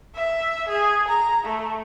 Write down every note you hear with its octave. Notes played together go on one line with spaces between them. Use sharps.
E5
G#4
A#5
A3